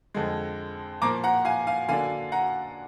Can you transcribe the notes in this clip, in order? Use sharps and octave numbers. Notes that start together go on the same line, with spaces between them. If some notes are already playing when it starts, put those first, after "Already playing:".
F2 D3 G#3
A#2 F3 A#3 A#5 D6
F#5 A#5
F5 G#5
F5 G#5
D3 F#3 A#3 D4 F5 G#5
F#5 A#5